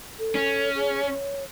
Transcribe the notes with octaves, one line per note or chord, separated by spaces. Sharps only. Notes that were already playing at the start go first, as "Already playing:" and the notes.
A4
C#4
G#4
C#5